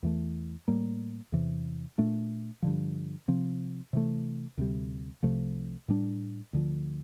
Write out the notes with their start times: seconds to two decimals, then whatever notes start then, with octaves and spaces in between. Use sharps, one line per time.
0.03 E2 E3 A3
0.68 A2 G3 A#3
1.32 E2 C3 E3
1.98 A#2 A3 D4
2.63 G2 D3 F3
3.28 C3 F3 C4
3.93 C3 E3 A3
4.58 D2 C3 G3
5.23 C2 C3 F3 A3
5.88 A2 G3 D4
6.53 D2 D3 F3